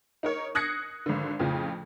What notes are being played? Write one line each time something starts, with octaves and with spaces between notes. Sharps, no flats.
D#4 A#4 C#5
D#6 F#6 G#6 A#6 C7 C#7
G#1 D3
F2 A2 C#3 F3